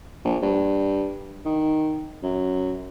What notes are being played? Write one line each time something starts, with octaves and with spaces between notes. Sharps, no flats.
A#1
G2
D#3
F#2